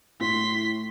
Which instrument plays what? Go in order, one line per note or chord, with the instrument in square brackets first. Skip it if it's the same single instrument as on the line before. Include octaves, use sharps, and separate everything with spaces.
[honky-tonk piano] A2 [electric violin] C6 B6